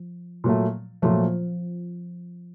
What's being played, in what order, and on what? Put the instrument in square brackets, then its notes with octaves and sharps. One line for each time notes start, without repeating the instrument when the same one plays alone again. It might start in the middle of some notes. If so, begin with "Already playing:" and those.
Already playing: [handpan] F3
[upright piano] A#2 F#3 A3
[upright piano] A#2 F#3 A3 [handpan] F3